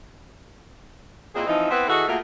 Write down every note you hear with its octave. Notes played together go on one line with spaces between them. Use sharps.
A#2 C4 E4 G#4 C5 D#5
E3 F3 C4 D#4
B3 C4 E4 B4
E3 F#4 G#4 A4 D#5 F#5
A3 A#3 F4 F#4 G#4 A#4